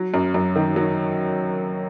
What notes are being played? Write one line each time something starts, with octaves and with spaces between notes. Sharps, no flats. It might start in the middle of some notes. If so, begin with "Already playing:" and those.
Already playing: F#3
F#2
F#2
D#3
F#3